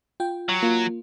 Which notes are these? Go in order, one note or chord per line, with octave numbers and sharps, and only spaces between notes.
F4 G5
F#3
A#3 F4